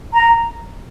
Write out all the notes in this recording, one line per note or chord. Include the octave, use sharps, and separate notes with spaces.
A#5